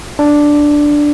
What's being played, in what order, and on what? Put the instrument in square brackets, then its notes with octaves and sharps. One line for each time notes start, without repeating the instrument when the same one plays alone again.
[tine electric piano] D4